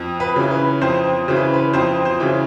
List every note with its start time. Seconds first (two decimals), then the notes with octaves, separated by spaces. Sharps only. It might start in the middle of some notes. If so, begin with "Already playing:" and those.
Already playing: F2
0.20 B4
0.36 C#3 E3
0.51 B4
0.81 F2 C5
1.28 C#3 E3 C5
1.36 B4
1.54 B4
1.73 F2 C5
2.05 C5
2.20 C#3 E3